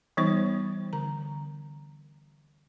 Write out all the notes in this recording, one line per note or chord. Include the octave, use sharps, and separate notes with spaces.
E3 G3 B3 D#4 C5 C#5
D3 A#5